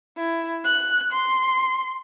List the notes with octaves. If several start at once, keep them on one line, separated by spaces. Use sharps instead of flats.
E4
F#6
C6